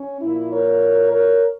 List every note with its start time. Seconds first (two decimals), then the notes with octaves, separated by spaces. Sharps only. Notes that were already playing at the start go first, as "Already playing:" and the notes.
Already playing: C#4
0.21 A#2 F3 A#3 E4
0.52 A#4 C#5
1.12 A#4 C#5